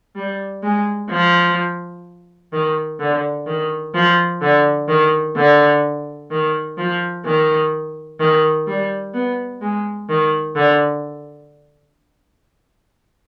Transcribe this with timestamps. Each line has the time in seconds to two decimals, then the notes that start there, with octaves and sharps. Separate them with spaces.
0.16 G3
0.63 G#3
1.10 F3
2.53 D#3
3.00 D3
3.47 D#3
3.94 F3
4.41 D3
4.88 D#3
5.36 D3
6.31 D#3
6.78 F3
7.25 D#3
8.20 D#3
8.67 G3
9.14 B3
9.61 G#3
10.09 D#3
10.56 D3